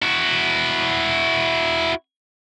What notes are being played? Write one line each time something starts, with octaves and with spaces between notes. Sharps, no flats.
E4 F#4